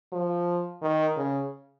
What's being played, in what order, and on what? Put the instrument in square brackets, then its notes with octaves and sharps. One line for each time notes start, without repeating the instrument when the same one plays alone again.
[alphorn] F3
D#3
C#3